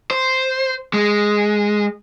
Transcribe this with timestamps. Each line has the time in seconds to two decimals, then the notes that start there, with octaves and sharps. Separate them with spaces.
0.11 C5
0.93 G#3